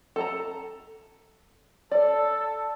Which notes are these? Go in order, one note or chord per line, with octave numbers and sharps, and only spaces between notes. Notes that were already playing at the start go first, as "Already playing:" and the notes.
A4 A5 A#5
A4 D5